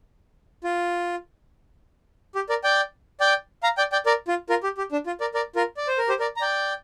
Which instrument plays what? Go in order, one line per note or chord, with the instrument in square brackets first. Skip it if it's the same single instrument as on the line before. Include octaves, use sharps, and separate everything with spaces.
[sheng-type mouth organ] F4
G4
A#4 D5
D5 G5
D5 G5
F5 A#5
D5 G5
D5 G5
A#4 D5
F4
F4 A#4
G4
G4
D4
F4
A#4 D5
A#4 D5
F4 A#4
D5
C5
A#4
G4 C5
A#4 D5
A#5
D5 G5